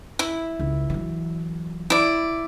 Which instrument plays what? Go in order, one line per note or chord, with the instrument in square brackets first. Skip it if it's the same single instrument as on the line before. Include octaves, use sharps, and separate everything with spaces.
[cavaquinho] E4
[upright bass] C#2
E3 F#3
[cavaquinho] E4 D5